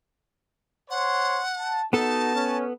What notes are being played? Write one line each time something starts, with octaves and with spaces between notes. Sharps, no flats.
C5 C#5 F#5 C6
A5
B3 D#4 F#4 A4 A5
C#4